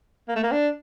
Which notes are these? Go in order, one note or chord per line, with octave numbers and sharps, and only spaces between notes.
A#3
A3
A#3
D4